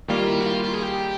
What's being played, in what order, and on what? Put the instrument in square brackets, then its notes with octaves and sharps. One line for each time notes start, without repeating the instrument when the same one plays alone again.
[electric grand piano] D#3 G3 A#3 [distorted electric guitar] F4
[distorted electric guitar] E4
F#4
F4
F4
G#4
G4